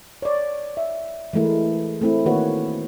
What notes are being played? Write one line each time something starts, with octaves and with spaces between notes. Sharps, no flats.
C#5 D5
E5
E3 G#3 A3 E4 A#4
A3 C4 E4
D#3 A#3 F#4 B4 C#5